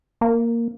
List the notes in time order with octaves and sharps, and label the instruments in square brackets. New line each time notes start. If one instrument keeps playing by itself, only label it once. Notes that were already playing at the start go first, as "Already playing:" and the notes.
[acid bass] A#3